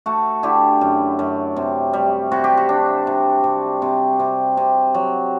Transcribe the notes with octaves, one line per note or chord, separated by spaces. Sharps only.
A3 F#4
D3 E4 G4
F#2
F#2
C3
G3
C3 F#4
G4
F#4
D4
C3
C3
C3
C3
C3
F#3